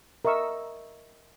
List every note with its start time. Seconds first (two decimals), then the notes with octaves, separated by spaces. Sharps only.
0.25 A#4 D#5 E5 C#6 E6